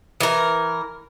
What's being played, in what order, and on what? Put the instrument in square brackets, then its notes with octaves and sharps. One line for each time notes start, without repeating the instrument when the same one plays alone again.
[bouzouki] E3 A#4